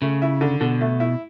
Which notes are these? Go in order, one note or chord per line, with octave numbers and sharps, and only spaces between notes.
C#3 A3
E4
D3
B2 D3
A3
E4